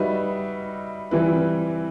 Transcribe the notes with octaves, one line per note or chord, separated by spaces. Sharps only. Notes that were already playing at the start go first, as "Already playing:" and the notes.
Already playing: G3 D#4 F#4 B4 E5
E3 G3 C4 E4 B4